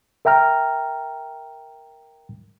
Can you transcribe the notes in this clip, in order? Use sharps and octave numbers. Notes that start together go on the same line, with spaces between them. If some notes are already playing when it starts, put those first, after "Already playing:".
A#4 E5 G5 A#5 F6